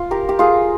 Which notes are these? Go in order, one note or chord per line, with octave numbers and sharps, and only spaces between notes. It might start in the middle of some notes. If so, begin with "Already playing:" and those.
Already playing: F4
G4 A#4
G4
F4 G#4